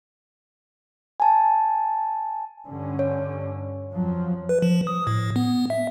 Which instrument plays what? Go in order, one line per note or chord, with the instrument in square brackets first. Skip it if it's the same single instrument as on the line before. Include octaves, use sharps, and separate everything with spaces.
[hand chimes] G#5 A5
[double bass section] G2 D3 C#4
[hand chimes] C#5
[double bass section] F2 F3 F#3
[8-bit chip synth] B4
F3
D#6
A2
B3
E5